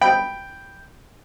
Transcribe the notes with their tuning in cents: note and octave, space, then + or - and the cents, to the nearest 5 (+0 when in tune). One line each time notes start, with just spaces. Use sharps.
G5 +0 B5 +0